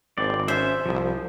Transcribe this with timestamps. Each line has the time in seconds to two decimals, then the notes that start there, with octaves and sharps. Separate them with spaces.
0.18 G#1 C4 D5
0.48 C#4 C5 E5
0.86 C2 F3